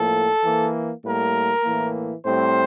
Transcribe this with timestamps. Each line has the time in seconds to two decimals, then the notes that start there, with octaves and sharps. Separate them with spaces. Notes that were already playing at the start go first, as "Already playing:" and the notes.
Already playing: A2 F3 A#3 A4
0.44 E3 A#3
1.04 A2 G3 A#3 A#4
1.64 A2 E3 A#3
2.25 A2 G3 C4 C5